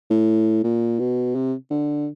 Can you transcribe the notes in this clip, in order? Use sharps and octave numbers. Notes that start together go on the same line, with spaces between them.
A2
A#2
B2
C3
D3